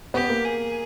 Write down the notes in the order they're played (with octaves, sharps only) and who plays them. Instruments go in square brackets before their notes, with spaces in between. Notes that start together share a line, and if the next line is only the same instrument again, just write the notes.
[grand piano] B3 [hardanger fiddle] G4
[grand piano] A#3
[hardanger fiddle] G#4